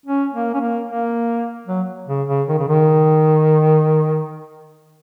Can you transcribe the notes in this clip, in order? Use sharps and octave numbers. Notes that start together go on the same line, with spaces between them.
C#4
A#3
C#4
A#3
A#3
F#3
C#3
C#3
D#3
C#3
D#3